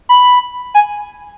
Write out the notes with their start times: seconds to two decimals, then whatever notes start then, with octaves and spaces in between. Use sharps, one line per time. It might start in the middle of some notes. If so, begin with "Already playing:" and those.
0.09 B5
0.74 G#5